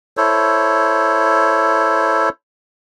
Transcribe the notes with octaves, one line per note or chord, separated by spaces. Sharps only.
E4 A4 C5 C#5